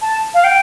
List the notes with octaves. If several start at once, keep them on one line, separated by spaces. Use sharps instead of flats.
A5
F5
G5